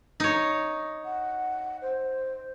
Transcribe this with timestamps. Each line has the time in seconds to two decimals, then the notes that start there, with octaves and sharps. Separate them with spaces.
0.20 D#4 C#5
1.05 F#5
1.82 C5